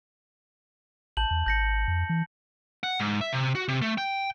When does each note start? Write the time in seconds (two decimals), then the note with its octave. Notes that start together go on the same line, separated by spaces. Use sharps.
1.17 A1 A5 G6 F#7
1.31 E2
1.46 G#1 G6 A#6 C#7
1.88 F2
2.09 E3
2.83 F#5
3.00 G#2
3.21 E5
3.33 C3
3.55 F#4
3.68 C3
3.82 A3
3.98 G5